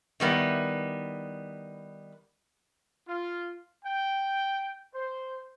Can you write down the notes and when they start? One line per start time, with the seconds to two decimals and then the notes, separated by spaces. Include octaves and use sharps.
0.20 D#3 G3 B3 E4
3.07 F4
3.84 G5
4.94 C5